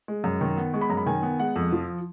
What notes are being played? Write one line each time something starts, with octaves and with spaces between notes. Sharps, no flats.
G#3
F#2
D#3
B3
G#3 C#6
B5
F#2 A#5
B5
D#3 G#5
B3
G#3 F#5
F2
F3